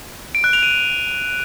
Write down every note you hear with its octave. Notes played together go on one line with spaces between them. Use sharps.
D7
F#6
F7
D#7